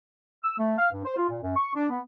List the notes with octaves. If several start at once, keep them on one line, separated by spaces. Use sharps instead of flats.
E6
A3
F5
G2
C5
F4
A#2
F#2
C#6
D4
B3